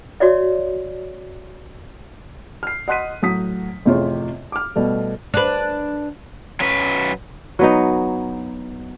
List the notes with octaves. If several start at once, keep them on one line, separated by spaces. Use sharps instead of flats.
F#4 C#5 D5 E5
F6 C7
D#5 F#5 C6 F#6 B6 D#7
A2 F#3 D#6 B6
A1 F2 C3 F4 G#4 C#5
D6 F6
B2 G3 A3
D4 B4
F#3 C#4 B4
F#3 B3 D#4